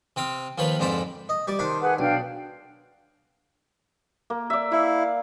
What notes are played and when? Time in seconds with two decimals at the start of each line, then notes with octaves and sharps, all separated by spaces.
0.16 C3 C4 F5 D#6
0.58 D#2 F3 B4 C#5 F5 B5
0.79 F2 G#2 D3 C5 D5 B5
1.29 D#5
1.47 G3 D5
1.59 D#3 D4 C5 B5
1.81 G#4 B4 F#5
1.99 B1 D4 F5 G5
4.30 A#3
4.50 D5 E5
4.72 E4 F5